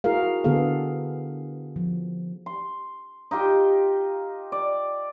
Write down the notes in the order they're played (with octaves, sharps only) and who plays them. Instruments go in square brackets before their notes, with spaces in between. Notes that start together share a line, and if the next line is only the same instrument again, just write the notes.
[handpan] E4 F#4 G#4 A#4 F5
D3 B3 G#4 A4 F5
F3
[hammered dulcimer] C6
D#4 F4 G4 G5
D5